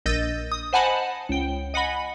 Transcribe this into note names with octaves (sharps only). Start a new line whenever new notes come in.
A#1 D#5 E6 G6 A6 A#6
D#6
C5 D#5 F#5 G#5 A5 B5
C#2 G5
D#5 F#5 G#5 B5